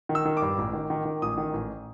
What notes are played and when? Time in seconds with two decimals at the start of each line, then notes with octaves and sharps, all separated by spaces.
0.09 D#3
0.15 E6
0.25 D#3
0.37 D6
0.42 G2
0.58 A1
0.73 D#3
0.90 D#3
1.05 D#3
1.22 A1 D#6
1.38 D#3
1.53 A1